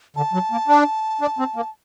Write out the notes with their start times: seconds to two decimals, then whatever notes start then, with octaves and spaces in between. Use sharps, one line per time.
0.16 D3 A5
0.33 F#3
0.52 A#3
0.68 D4
1.21 D4
1.39 C4
1.56 A#3